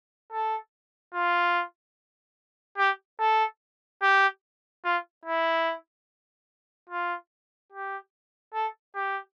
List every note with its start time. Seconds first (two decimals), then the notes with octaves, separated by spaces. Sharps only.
0.32 A4
1.14 F4
2.78 G4
3.20 A4
4.02 G4
4.85 F4
5.25 E4
6.90 F4
7.73 G4
8.54 A4
8.95 G4